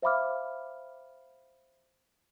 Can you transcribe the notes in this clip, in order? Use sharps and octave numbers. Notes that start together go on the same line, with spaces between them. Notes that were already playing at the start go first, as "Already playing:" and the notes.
C5 E5 F5 B5 D6 F6